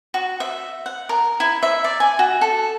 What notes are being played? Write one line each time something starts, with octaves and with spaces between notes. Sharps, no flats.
F#4
E5
F#5
A#4
E4
E5
D5
G#5
F#4
A4